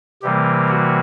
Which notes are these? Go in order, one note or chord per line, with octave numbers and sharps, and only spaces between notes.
C3 E3 G3 A#3 G4
F#4